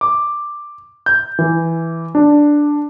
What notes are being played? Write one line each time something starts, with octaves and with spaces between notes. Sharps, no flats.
D6
G6
E3
D4